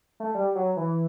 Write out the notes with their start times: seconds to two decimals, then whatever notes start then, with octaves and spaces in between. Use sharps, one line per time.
0.20 A3
0.35 G3
0.55 F#3
0.77 E3